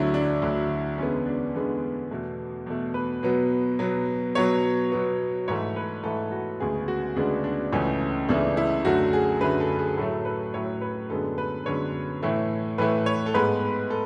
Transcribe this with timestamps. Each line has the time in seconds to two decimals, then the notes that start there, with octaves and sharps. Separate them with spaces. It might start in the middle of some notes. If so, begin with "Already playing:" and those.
Already playing: D2 D3 F#3 E4
0.14 D4
0.42 D2 D3 F#3
0.98 E2 D3 G#3 B3 C#4
1.26 D4
1.54 E2 D3 G#3 B3
2.11 E2 B2 A3
2.66 E2 B2 A3
2.94 B4
3.23 B2 F#3 B3
3.79 B2 F#3 B3
4.35 B2 F#3 B3 C#5
4.92 B2 F#3 B3
5.48 G#2 E3 A3 C#5
5.76 B4
6.03 G#2 E3 A3 A4
6.32 F#4
6.60 D2 C#3 G#3 B3 G#4
6.88 F#4
7.16 D2 C#3 G#3 B3 D4
7.44 D4
7.72 C#2 C#3 E3 A3 C#4
8.29 C#2 C#3 E3 A3 D4
8.57 E4
8.85 F#2 D3 A3 F#4
9.13 G#4
9.41 F#2 D3 A3 B4
9.60 A4
9.79 G#4
9.97 A2 F#3 A3 A4
10.25 B4
10.54 A2 F#3 A3 C#5
10.81 B4
11.10 F#2 D3 G#3 B3 A4
11.38 B4
11.66 F#2 D3 G#3 B3 C#5
12.22 A2 E3 A3
12.78 A2 E3 A3 B4
13.06 C#5
13.26 A4
13.34 G#2 G#3 B3 B4
13.90 A4